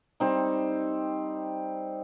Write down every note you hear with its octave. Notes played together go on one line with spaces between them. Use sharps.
G3 C4 D#4